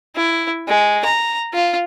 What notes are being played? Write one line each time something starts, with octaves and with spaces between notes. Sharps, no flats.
E4
G#3
A#5
F4